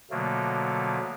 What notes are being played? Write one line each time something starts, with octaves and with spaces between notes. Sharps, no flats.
B2 D3 F3 F#3 A3 A#3